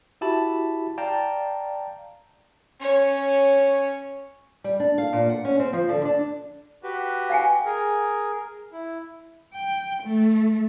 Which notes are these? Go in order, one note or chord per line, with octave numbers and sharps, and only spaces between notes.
E4 F#4 G4 E5 A5 B5
D5 F5 G5 A5 A#5
C#4 C#5
G3
D4
F5
A#2
F#5
C#4
C4
F3
D3
D4
F#4 G4 B4
F5 G5 G#5
G#4 A#4
E4
G5
A3